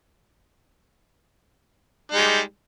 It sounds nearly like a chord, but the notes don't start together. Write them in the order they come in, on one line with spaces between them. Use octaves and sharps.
D#4 G#3 G3